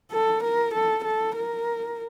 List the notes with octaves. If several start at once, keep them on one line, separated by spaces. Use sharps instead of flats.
A4
A#4
A4
A4
A#4